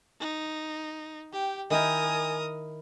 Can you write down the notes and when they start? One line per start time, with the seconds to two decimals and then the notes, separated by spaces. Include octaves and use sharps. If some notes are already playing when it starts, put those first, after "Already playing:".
0.20 D#4
1.33 G4 G5
1.70 D#3 E4 A#4 G5 G#5 D#6